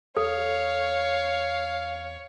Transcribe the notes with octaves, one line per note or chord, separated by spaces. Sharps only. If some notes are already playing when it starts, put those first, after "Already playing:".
E2 A4 C#5 F5